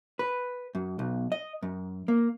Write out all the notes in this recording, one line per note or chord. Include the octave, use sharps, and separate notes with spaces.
B4
F#2
B1
D#5
F#2
A#3